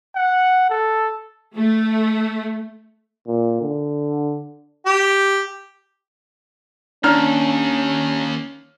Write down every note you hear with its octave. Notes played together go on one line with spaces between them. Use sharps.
F#5
A4
A3
A#2
D3
G4
D#2 C#4 D4 A#5 F6